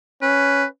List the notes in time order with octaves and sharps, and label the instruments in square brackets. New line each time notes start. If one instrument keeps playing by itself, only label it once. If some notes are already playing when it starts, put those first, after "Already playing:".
[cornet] C#4 [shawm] B4